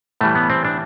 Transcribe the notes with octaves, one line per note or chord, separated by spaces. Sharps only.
A2 E3 G3 A3
B3
C4
D4